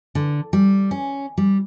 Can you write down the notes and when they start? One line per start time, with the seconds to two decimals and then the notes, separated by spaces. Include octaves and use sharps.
0.15 D3
0.53 G3
0.91 C#4
1.38 G3